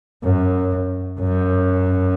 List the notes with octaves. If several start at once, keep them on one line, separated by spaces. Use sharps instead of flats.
F#2
F#2